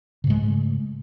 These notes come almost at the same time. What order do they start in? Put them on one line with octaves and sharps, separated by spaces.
C#3 G#2 G#3 A3